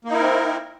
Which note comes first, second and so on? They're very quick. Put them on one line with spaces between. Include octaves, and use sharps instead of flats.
A#3 D#4 E4 A#4 C4